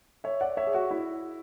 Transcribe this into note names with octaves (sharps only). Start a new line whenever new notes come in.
C#5 E5
D5 F#5
C#5 E5
G#4
F#4
E4